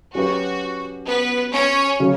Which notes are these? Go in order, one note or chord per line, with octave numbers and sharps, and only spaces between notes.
F#3 C#4 F#4 G4 B4
B3 B4
C#4 C#5
C#3 F#3 C#4